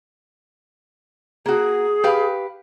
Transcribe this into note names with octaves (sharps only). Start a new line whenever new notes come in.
A#3 F#4 G#4
G4 B4 F5